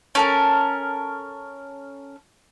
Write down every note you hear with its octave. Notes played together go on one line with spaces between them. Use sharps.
C#4 A4 A#4